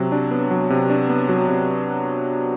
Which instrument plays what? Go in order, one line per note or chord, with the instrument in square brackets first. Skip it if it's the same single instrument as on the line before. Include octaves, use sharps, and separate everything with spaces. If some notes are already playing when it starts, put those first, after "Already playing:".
Already playing: [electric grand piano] C3 F#3
D4
B3
F#3
C3
D4
B3
F#3
C3